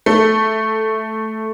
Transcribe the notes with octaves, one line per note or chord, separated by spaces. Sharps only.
A3